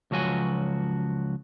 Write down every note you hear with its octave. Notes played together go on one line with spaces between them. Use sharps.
C#2 F3 F#3 F#4 G#5